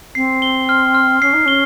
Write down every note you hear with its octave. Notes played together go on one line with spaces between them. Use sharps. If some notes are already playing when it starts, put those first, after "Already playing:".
C4 C7
G7
F6
F6
C#4 C7
D#4
C#4 G7